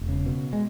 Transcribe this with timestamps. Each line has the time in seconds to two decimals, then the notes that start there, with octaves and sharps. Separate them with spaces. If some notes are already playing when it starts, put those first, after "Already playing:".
Already playing: E1
0.08 C#3
0.26 B2
0.53 G#3